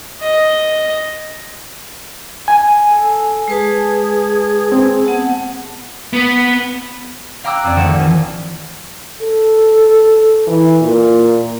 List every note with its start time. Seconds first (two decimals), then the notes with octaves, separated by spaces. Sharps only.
0.21 D#5
2.48 G#5
2.90 A4
3.48 G#3 G#4 B4 A5
4.72 C4 G#4
5.05 B3 F#5 A5
6.13 B3
7.44 F5 G5 A#5 D6 E6 F#6
7.64 F2 C4 D5
7.75 G#1 D#3 A3 A4 F#5 E7
7.88 A#1
8.00 E3 F3
9.22 A4
10.47 E3
10.82 A#2